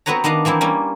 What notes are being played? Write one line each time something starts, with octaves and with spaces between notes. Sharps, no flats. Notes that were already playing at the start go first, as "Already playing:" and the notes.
B3 C4 F#4 B4 C#5 A#5
D#3 B3 D4 D#5 F5
E3 A#3 C4 E4
G3 A#3 C#4